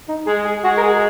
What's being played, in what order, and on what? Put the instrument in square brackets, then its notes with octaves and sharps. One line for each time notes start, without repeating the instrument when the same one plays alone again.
[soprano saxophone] D#4
[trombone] G#3 [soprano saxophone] G#4
[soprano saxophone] G#4
[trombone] G#3 [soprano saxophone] F#4
[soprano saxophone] A#4
G#4